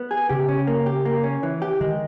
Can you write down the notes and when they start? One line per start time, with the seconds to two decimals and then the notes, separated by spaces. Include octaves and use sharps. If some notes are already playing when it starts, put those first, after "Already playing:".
Already playing: B3
0.11 G#4
0.29 C#3 G4
0.49 C#4
0.67 A#3
0.86 G4
1.05 A#3
1.23 C#4
1.43 E3
1.62 G4
1.81 D#3 G#3